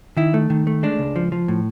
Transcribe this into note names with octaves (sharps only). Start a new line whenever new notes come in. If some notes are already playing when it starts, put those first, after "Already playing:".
D#3 E4
A3
D#3
A3
G#3 D4
C#2
F3
F3
A2